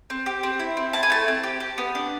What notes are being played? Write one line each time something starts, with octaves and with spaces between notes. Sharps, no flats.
C4
G4
C4
E4
C4
E4 A5
G#5
A3 A5
C4
G4
G4
B3
D4